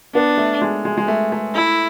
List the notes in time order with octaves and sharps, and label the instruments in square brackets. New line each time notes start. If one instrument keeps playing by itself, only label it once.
[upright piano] B3 [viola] D4
[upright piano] A3
G#3
G#3
G#3
A3
A3
[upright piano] A3 [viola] E4